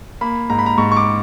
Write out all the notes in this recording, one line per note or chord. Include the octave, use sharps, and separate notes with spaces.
A#3 B5
G#2 A#5
B5
A#5
G#2 C#6
C#6
D6